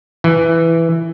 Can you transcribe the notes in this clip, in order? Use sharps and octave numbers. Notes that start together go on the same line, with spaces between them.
E3